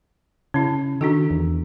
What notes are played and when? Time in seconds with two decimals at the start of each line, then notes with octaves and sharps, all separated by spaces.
0.54 C#3 C#4 E4
1.01 D#3 D4 F#4 A4
1.31 E2